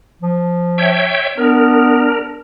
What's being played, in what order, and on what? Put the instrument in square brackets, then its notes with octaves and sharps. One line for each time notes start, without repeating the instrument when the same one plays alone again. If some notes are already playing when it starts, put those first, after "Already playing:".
[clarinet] F3
[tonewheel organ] C#5 E5 G5
[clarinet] B3 [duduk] D4 [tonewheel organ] A#4